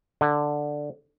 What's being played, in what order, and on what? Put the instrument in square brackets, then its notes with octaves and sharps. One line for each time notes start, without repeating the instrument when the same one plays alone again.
[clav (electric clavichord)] D3